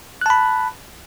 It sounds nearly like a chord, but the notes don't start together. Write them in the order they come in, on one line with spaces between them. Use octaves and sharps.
F#6 A5 B5